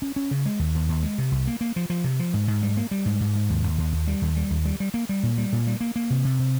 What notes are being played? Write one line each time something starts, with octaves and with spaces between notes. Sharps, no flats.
C#4
C#4
C#3
G#3
D#2
D#2
D#2
G#3
C3
C2
A#3
A#3
F3
F3
C3
F3
G#2
G#2
G3
A#3
G3
G#2
G#2
G#2
D#2
D#2
D#2
D#2
G3
D#2
G3
D#2
G3
G3
A#3
G3
A#2
G3
A#2
G3
A#3
A#3
C3
C3
C3